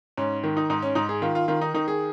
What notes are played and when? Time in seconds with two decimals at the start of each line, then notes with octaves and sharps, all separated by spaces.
0.17 G#2 C#4
0.44 D#3
0.57 D#4
0.70 G#2 D#4
0.82 C#4
0.95 G#2 D#4
1.09 G#4
1.22 D#3 F4
1.35 F4
1.48 D#3 F4
1.61 D#4
1.74 D#3 D#4
1.88 G#4